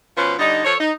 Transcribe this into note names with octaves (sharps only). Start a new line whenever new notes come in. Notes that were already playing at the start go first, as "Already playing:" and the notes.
B2 F3 C#4 B4 C5
D3 G3 D#4
F3 A4 C#5
D#4